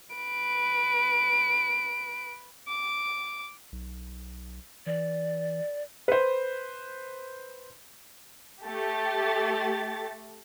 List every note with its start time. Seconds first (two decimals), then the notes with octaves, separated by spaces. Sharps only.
0.16 B4 D7
2.68 D6
3.72 B1
4.86 E3 D5
6.08 B4 C5
8.65 A3 G4 A6